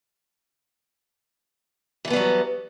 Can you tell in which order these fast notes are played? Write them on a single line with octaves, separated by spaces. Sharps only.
E3 A4 B3 G3 F#3